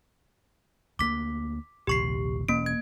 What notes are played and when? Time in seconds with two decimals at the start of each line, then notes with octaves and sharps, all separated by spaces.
0.99 D2 A3 A#3 D6 B6
1.87 A#1 D#2 C3 G4 C#6 C7
2.49 E1 A#3 C#4 D7
2.66 G#6